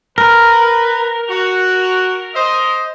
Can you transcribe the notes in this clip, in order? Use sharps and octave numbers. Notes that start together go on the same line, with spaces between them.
A#4 B4
F#4
C5 D#5